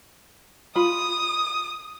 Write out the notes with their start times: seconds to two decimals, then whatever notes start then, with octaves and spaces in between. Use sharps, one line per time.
0.76 F4 B5 D#6